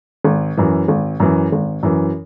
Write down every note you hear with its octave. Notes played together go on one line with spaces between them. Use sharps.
G#1
F#2 E3
G#1
F#2 E3
G#1
F#2 E3